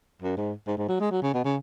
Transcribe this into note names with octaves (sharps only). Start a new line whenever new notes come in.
F#2
G#2
G#2
G#2
F#3
G#3
F#3
C#3
B2
C#3